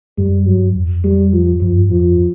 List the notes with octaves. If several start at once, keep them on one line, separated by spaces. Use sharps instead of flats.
F#2 G3
G2 F#3
F2
G3
F3
F#2 F3
G2
F2 F3